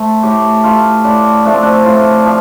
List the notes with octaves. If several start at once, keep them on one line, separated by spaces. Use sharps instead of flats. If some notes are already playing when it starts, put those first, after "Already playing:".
Already playing: A3 C5
A2 G4
A3 F4
A2 D4
F3 A3 D4
C4
D4
A2 F4
F3